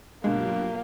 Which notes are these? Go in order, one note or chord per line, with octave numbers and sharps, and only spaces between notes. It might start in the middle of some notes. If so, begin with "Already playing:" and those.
G2 B2 D3 F#3 G#3 A#3 F4 G4